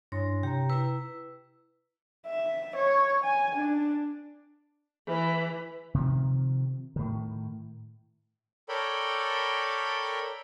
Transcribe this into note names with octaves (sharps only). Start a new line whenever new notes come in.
G2 D4 E4 C#5 C6 A#6
C3 G4 G5 A#5
E4 B4 E6
E5
C#5
G#5
D4
E3
C3 D#3 F3
A2 D#3
A4 A#4 C#5 D5 G5 B5